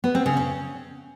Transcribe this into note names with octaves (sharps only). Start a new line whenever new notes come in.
B3
C4
C#3
C#4